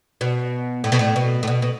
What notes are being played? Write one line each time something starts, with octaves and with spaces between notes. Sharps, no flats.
B2
A2
B2
A2
B2
A2
B2
B2